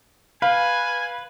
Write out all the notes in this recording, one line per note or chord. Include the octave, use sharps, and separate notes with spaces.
B4 F5 G#5